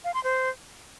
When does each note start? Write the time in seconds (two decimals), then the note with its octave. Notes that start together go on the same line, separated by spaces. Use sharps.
0.04 F5
0.14 C6
0.24 C5